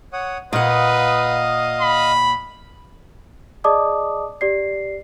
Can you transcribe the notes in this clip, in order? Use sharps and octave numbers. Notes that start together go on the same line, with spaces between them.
C#5 F#5 D#6
A#2 B4 D#5 F5 F#5 D#6
B5
G#4 D5 D#5 A5 D6 D#6
G4 D5 C7